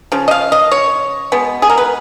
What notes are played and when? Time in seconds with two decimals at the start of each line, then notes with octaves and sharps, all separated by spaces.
0.12 C#3 F3
0.28 D#5
0.31 F5
0.52 D#5
0.71 C#5
1.32 B2 G#3 B3
1.62 G#4
1.70 A#4
1.78 B4